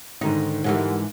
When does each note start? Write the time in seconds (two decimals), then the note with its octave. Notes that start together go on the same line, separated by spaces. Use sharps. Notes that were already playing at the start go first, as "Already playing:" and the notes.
0.21 G#2 D3 D#3 D#4
0.64 G#2 D3 E3 G3 A#4 F#5